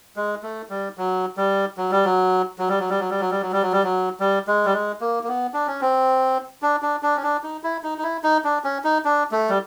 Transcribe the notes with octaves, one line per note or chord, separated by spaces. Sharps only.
G#3
A3
G3
F#3
G3
F#3
G3
F#3
F#3
G3
F#3
G3
F#3
G3
F#3
G3
F#3
G3
F#3
G3
F#3
G3
G#3
G3
G#3
A#3
A#3
B3
D4
C#4
C4
D4
D4
D4
C#4
D4
D#4
E4
D#4
D#4
E4
D#4
D4
C#4
D#4
D4
A3
G3